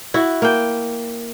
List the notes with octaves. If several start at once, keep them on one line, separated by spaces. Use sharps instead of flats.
E4 F#4
A#3 G5